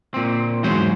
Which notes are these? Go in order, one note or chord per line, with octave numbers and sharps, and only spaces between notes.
A#2 C4
E2 G#2 F#3 C5